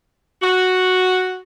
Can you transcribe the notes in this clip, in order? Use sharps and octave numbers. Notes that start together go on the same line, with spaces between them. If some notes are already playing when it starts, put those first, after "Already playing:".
F#4